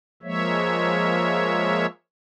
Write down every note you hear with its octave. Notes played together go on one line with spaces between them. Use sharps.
F3 G#3 A#3 C#5 E5